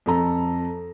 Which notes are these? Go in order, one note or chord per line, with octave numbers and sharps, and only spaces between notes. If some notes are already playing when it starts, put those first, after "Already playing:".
F2 A4 A#5